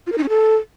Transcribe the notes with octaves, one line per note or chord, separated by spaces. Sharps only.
F4
A#4
D#4
C#4
A4